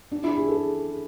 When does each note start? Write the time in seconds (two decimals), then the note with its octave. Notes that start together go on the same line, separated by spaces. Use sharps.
0.12 D4
0.24 E4
0.36 G#4
0.48 A4